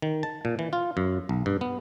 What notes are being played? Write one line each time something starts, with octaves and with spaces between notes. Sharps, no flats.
D#3
A5
A#2
E3
F4
F#2
B1
G2
B3